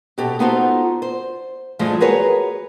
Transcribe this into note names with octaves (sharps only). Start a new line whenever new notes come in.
B2 G4 A4
B3 D#4 F4 F#4 A4 C5
C5
G2 E3 F3 G#3 A3
F#4 G#4 A#4 B4 C#5